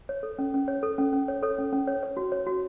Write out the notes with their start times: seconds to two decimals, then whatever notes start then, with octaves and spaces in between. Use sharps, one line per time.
0.09 C#5
0.23 A4
0.39 C#4
0.54 C#4
0.68 C#5
0.83 A4
0.98 C#4
1.13 C#4
1.28 C#5
1.43 A4 C#5
1.58 C#4
1.73 C#4
1.87 C#5
2.03 C#5
2.17 F#4
2.32 C#5
2.47 F#4